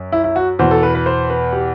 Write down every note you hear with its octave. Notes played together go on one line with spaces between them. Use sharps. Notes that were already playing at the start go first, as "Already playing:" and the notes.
Already playing: F#2
E4
E4
F#4
E2 B2 C5
A4
B4
B4
C5
B4
G4